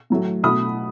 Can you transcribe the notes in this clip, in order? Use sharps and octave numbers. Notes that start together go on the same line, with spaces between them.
A2 F#3 A3
B2 A3 B5 D#6